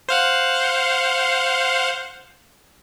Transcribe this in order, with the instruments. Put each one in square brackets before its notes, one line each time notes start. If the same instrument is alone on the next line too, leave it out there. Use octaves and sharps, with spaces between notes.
[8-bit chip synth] C5 F5 F#5